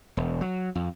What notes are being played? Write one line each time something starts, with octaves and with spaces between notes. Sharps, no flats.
E1
F#3
F2